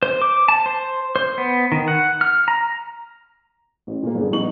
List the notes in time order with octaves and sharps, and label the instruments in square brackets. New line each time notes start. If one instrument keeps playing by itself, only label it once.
[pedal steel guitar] C5
D6
A5
C5
C5
B3
D#3
F#5
F6
A#5
[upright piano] A1
A#2 A#3
G1 D4 G#4
A#1 G3 B3 D#4 C#6 F#7